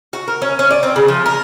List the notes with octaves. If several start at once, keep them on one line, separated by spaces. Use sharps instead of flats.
F#4
A#4
C#4
C#4
D5
C4
C#3
F3
A#4